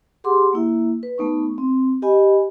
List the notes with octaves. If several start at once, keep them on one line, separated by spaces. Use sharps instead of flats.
G4 G#4 F#5 C6 D6
A#3 E4 E5
B4
A3 B3 D#4 C#6
C4
G4 D#5 G#5 B5